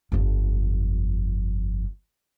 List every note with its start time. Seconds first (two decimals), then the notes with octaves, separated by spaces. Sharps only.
0.12 G1 F2